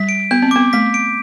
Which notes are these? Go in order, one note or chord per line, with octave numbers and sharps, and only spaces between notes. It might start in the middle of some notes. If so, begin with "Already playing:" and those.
Already playing: G3 B6
D7
B3 G6
C4
B3 D6
A3 B6
D7